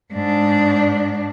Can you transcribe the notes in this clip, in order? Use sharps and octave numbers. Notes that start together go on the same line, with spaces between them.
G#2 D4